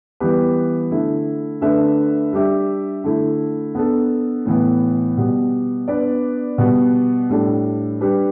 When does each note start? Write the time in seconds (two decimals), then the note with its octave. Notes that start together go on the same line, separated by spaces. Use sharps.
0.20 E3 G3 B3 G4 B4
0.91 D3 A3 E4
1.61 D3 A3 D4 B4 E5
2.33 G3 D4 G4 E5
3.04 D3 A3 E4
3.75 B3 D4 A4
4.46 A2 E3 B3
5.17 B2 G3 B3
5.88 B3 D4 B4 D5
6.58 B2 G3 B3
7.30 A2 G3 D4 A4
8.01 G3 D4 G4 B4